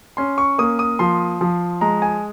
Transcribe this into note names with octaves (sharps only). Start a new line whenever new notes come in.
C#4 C6
C#6
A#3 D#6
D#6
F3 C6
F3
G#3 A#5
G#5